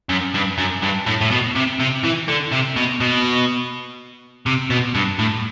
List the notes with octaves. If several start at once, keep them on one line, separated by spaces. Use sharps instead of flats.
F#2
G2
F#2
G2
A2
A2
B2
C3
C3
E3
D3
C3
B2
B2
C3
B2
G2
A2